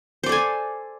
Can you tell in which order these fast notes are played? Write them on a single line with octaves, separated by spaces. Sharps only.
C5 D5 A4 G#5